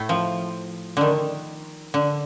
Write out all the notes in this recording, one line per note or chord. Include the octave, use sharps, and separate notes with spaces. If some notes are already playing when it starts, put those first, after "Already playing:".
Already playing: A2 A3
F3
D3 D#3
D3